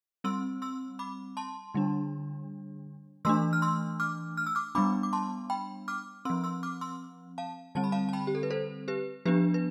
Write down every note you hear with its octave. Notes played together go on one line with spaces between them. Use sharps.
G3 C4 C6 E6
C6 E6
B5 D6
A5 C6
D3 G3 D4
E3 A3 D4 C6 E6
F6
C6 E6
D6 F6
F6
E6
D6 F6
G3 B3 D4 B5 D6
D6
A5 C6
G5 B5
D6 F6
F3 C4 C6 E6
C6 E6
D6 F6
C6 E6
F5 A5
D3 G3 C4 A5
B5
F5 A5
A5
G5 B5
G4
A4
B4
A4 C5
G4 B4
F3 B3 D4 G4 B4
B4